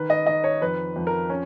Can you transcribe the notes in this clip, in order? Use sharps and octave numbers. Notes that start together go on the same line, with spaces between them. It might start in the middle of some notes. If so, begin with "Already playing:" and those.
Already playing: D#3 D#4 B4
D#5
D#3 D#5
C#5
F2 B4
F2
A#4
C#4